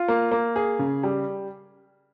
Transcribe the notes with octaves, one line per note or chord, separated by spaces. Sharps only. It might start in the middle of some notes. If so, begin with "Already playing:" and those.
Already playing: F4
A#3
A#3
G#4
C#3
G3